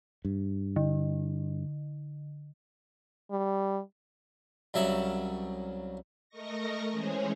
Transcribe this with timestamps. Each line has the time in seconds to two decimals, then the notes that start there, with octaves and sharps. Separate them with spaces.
0.25 G2
0.76 D3
3.31 G3
4.74 C2 C#3 F#3 E5 F#5
6.29 A3 A#4 D#5 C#6 A#6
6.91 E3 G#3 C#4 G#4 C5 C#5